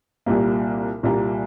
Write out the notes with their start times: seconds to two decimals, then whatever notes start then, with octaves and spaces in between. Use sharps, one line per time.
0.26 C2 A#2 G3 A#3
1.03 C2 A#2 G3 A#3